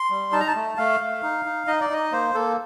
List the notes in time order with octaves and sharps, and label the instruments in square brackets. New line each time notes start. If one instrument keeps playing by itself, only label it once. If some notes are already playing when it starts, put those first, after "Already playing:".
Already playing: [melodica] C6
G3
D#4 A5
A#5
A5
A3
A3 F5
A3
D#4
D#4
D#4 D#5
D5
D#4 D#5
A#3 C5
A#3 A4